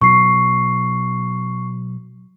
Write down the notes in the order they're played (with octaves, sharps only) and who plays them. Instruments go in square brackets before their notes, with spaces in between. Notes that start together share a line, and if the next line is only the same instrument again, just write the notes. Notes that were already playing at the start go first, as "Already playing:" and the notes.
[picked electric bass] B2 F#3 [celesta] C#6 C7